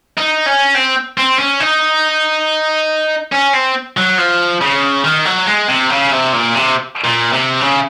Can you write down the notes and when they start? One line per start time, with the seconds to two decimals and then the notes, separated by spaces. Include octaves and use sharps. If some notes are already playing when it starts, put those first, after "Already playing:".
0.18 D#4
0.46 C#4
0.75 C4
1.17 C4
1.39 C#4
1.60 D#4
3.32 C#4
3.54 C4
3.97 F#3
4.18 F3
4.61 C#3
5.04 D#3
5.25 F#3
5.47 G#3
5.68 C3
5.90 C#3
6.11 C3
6.33 A#2
6.54 C3
7.04 A#2
7.33 C3
7.61 C#3